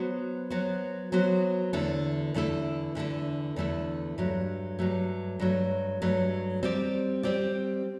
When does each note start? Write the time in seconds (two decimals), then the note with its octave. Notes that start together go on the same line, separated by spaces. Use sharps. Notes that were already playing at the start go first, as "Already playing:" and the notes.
Already playing: F#3 B3 F#4 C5
0.50 F#3 B3 F#4 C5
1.12 F#3 B3 F#4 C5
1.73 E2 D3 A3 E4 A4
2.34 E2 D3 A3 E4 A4
2.95 E2 D3 A3 E4 A4
3.56 E2 D3 A3 E4 A4
4.18 G2 F#3 A3
4.79 G2 F#3 A3
5.39 G2 F#3 A3
6.02 G2 F#3 A3
6.63 G3 C4 G4 D5
7.23 G3 C4 G4 D5